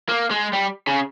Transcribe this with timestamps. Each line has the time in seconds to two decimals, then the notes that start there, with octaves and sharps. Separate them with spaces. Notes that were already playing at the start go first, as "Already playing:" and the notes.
0.09 A#3
0.31 G#3
0.53 G3
0.87 C#3